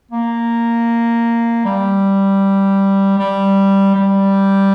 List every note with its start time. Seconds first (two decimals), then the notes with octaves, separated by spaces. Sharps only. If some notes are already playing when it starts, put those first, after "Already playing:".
0.11 A#3
1.65 G3
3.19 G3
3.95 G3